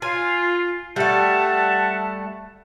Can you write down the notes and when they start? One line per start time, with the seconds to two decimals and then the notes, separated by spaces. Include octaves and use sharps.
0.02 F4 G#5
0.96 G3 A3 E5 F#5 A5